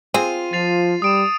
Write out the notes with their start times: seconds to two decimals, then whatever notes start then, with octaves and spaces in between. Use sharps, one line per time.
0.14 C4 F4 G#4 D#7
0.53 F3 A6 C7 F7
1.02 G3 D#6 D7 E7